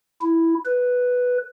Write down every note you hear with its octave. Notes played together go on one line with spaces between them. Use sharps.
E4
B4